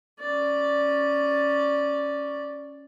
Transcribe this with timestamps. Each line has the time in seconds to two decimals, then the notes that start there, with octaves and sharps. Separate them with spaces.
0.20 C#4 D5